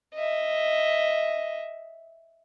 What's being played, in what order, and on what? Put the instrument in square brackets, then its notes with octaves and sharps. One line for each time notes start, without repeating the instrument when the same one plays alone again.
[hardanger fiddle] D#5 E5